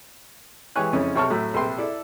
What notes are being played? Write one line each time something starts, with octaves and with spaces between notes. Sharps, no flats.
E3 G#3 G4 C#5 G#5 F#6
F2 C#3 C#4 E4
B1 C3 C#5 A5 F6
A2 F#3 F#4 E5
A#1 C3 A4 B4 G5 C6
E4 A4 D5